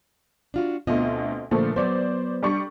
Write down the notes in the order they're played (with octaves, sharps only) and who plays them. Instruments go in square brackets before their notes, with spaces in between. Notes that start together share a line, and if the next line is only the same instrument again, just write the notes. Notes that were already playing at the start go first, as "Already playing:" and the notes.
[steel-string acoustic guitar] D4 F4 F#4
[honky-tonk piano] D2 B2 [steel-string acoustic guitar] C4 F4 D#5
[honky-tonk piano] A#2 F3 A3 [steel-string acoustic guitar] D3
[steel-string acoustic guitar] F#3 B3 [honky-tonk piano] C5 D5
[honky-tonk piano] G3 D4 C#6